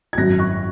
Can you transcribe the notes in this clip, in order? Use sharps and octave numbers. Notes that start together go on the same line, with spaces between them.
G#6
G#1 F#2 F#3 F#6 A#6
C#6 F#6